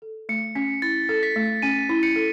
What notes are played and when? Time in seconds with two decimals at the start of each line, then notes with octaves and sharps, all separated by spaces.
0.02 A4
0.29 A3 C#7
0.55 C#4 B6
0.82 E4 A6
1.09 A4
1.23 B6
1.36 A3
1.62 C#4 D#7
1.89 E4
2.03 C#7
2.16 A4